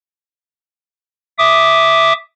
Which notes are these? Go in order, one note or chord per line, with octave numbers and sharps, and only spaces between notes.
E5 D6 D#6